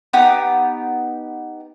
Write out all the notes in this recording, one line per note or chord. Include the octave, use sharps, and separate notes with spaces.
B3 D#4 G4 D#6